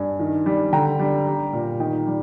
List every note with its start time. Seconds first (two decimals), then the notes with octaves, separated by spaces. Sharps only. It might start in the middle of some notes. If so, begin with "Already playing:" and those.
Already playing: G2 G#5
0.19 D#3
0.46 G3
0.73 D3 G5 A#5
0.99 G3
1.27 G3
1.53 A#2
1.80 D#3 D#5 G5
2.07 G3